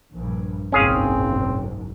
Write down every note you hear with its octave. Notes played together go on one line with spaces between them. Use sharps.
A#1 G2
F#1 B1 G#2 C4 C#4 G#4 F5